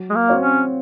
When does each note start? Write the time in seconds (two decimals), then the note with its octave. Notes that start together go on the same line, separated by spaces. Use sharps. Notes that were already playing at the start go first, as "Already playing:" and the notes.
Already playing: F#3
0.10 G#3
0.15 A#3
0.28 C4 F#4 C#5 F5
0.43 C#4